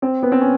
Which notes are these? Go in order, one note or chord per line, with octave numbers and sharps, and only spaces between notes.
C4
B3
C4
C#4